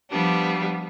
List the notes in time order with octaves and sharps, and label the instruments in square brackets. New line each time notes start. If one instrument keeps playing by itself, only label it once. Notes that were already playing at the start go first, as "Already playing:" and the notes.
[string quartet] F3 G3 B3 D4